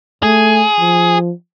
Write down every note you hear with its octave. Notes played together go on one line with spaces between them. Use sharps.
A3 G#4
F3